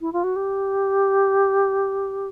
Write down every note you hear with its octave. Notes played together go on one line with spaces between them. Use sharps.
E4
F4
F#4
G4